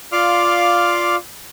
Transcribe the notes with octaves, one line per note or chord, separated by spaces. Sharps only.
F4 D5 F5 C6 D6 F6